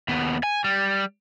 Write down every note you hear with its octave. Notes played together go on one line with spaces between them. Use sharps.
D#2 B3
G#5
G3